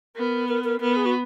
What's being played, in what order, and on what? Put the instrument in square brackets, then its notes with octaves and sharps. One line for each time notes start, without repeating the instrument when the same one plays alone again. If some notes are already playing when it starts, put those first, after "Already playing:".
[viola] B3 [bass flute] A#4
[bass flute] A#4
A#4
[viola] B3 [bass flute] A#4
[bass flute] G#4
F#4